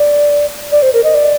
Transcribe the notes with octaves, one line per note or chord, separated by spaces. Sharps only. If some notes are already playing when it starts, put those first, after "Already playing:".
Already playing: D5
D5
C5
A#4
D#5
D5